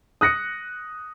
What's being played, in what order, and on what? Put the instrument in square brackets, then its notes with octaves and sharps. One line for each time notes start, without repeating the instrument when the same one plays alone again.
[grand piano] D#6 F#6 A#6 C#7